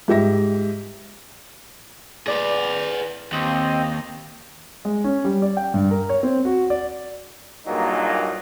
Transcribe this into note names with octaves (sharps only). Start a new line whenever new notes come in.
G#2 G4 E5 A#6
A2 G#4 B4 D5
D#2 C4 D#5
G#3
C#4
G3
D5
G5
G2
A#4
C#5
C4
F#4
D5
G2 A#2 F#3 G#3 A#3 D#4